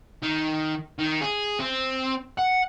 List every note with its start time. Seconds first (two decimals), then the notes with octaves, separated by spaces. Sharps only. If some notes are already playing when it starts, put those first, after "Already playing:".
0.23 D#3
0.99 D#3
1.21 G#4
1.60 C4
2.38 F#5